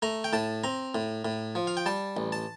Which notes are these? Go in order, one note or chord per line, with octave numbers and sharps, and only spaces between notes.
A3 A#5
G5
A2 A5
C4 A#5
A2
A2
F3
F5
G5
G3 A5
A1
A5